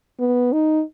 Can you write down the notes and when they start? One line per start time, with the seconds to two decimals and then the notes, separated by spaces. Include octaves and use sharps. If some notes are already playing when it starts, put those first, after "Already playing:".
0.20 B3
0.53 D#4